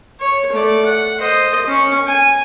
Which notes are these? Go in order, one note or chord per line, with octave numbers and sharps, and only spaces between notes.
C#5
A3 D5
F#5
C5 D#5
C#4 C#6
G#5